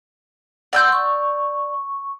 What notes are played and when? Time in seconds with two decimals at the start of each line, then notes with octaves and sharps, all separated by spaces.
0.73 D5 F#5 C6 E6 G6
0.92 C#6